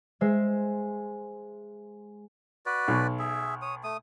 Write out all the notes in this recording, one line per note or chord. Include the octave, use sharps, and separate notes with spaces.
G#3 C5 E5
F#4 B4 D5
B1
G#4 E5
C#5 D#6
A3 D#6